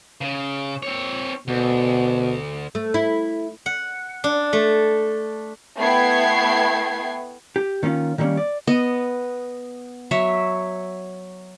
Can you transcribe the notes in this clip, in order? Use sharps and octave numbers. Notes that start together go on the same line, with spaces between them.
C#3
C4 C#5
D2 B2
A3
E4
F#5
D4
A3
A3 B3 E4 G5 G#6 C7
G4
D#3 A#3 C#4 F4
D#3 E3 G3 A3 A#3 C#4
D5
B3 D#5
F#3 C#5 E5